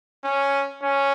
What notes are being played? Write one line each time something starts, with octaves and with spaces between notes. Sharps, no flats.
C#4
C#4